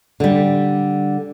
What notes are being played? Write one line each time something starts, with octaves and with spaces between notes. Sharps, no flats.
D3 G3